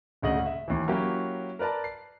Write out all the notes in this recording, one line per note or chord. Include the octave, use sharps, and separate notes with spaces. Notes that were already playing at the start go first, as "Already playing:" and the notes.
D#1 D2 C#3 D#5 F#7
E5
D#2 E3
F#3 A#3 C#4 E4 G4
A#4 B4 D5 A5 A#5
C7